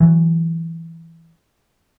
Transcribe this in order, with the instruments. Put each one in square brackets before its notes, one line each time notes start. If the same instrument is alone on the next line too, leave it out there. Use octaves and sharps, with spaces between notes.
[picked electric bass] E3 F#3